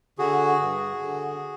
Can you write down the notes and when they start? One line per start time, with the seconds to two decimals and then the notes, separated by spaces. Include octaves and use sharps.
0.19 D3 F#4 G#4
0.60 G2
1.01 D3